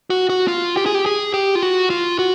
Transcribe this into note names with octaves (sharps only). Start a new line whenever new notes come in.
F#4
F#4
F4
G4
G#4
G4
G#4
G4
F4
F#4
F4
F#4